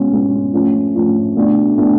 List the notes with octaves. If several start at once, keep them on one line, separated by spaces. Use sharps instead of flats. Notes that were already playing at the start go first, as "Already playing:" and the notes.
Already playing: B2 G#3 C#4
B2 G#3 C#4
F3 A3 C#4
F3 A3 C#4
B2 A3 D4
B2 A3 D4